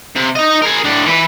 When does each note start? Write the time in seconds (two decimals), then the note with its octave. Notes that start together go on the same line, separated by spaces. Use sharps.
0.16 C3
0.36 D#4 D#5
0.62 G#4 A#4
0.85 A2 D4
1.06 E3 B4